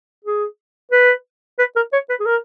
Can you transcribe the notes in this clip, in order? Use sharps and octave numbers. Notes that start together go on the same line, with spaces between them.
G#4
B4
B4
A#4
C#5
B4
G#4
A#4